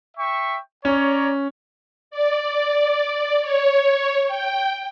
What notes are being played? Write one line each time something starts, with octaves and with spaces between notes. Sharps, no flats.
E5 G5 C#6
C#4 C#5 D5 A#5
D5
C#5
G5